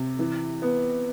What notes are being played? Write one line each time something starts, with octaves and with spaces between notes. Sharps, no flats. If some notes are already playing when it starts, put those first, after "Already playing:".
Already playing: C3
E3
B3